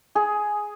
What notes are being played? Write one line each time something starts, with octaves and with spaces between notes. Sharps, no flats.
G#4